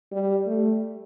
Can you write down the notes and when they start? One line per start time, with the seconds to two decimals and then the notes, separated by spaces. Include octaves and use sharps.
0.12 G3
0.47 A3